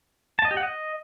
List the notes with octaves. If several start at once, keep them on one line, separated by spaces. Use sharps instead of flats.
A5
D#5
G4
F#5
D#5